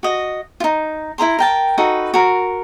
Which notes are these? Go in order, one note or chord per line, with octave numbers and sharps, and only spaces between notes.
F#4 D#5
D#4 F4
E4 C5 A#5 C6
A#4 G5 A5
D#4 F#4 A4 B4
F#4 A#4